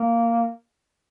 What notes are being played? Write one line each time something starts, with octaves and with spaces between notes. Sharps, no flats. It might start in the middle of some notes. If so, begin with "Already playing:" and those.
Already playing: A#3